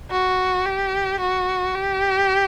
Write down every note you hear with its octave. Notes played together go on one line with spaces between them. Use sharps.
F#4
G4
F#4
G4